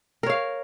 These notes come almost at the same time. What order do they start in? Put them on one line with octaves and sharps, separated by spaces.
A#4 C#5 F5